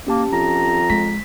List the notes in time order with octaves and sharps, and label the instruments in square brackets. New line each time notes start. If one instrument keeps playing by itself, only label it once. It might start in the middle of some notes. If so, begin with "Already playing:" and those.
[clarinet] A#3 [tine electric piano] C#4 G4 A5
[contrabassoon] F2 [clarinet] A#5
[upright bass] G#3 [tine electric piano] B6